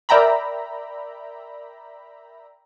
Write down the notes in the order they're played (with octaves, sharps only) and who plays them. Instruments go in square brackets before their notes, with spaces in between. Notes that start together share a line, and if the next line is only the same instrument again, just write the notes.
[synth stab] A#4 D5 E5 G5 A#5 B5